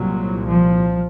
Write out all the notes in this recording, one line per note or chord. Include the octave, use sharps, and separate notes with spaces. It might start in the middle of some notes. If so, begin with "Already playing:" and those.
Already playing: C2 A#2 F#3
F3